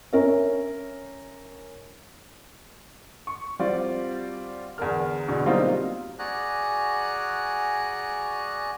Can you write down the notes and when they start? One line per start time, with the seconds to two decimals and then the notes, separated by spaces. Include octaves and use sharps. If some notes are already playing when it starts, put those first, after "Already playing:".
0.13 C#4 D4 A#4 C#5 E5
3.27 C#6
3.59 G3 C4 F4 F#4 D5
4.78 E2 D3 D4 A#4 F6
5.28 E2 B2 D3
5.45 F#3 G3 A#3 C4 D#4 F4
6.19 F#4 G#4 D5 G#5 A#5 F#6